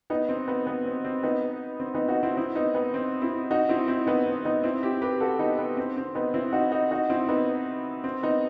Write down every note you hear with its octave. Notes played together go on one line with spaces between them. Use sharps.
B3 D#4
C4
B3
B3
C4
C4
B3 D#4
C4
B3 D#4
D#4 F#4
C4 E4
C4 E4
B3 D#4
B3
C4
C4 E4
D#4 F#4
C4 E4
C4 E4
B3 D#4
C4
B3 D#4
C4 E4
E4 G4
G4 B4
F#4 A4
B3 D#4
B3
C4
C4
B3 D#4
C4 E4
D#4 F#4
D#4 F#4
D#4 F#4
C4 E4
B3 D#4
C4
B3 D#4